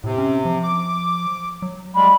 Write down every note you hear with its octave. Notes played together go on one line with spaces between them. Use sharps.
A2 C3
C#4
F3
D6
F#3
G3 G#3 B5